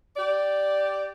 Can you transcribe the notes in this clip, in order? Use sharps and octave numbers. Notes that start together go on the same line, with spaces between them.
G4 D5